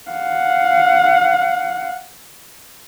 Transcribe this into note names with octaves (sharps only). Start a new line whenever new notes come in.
F5 F#5